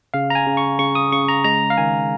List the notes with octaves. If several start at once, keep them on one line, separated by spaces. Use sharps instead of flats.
C#3 F5
A#5
G#5
C#3
C#6
C#3 C#6
D#6
C#3 C#6
A#5
G#3 A#5
F5
D#3 G#5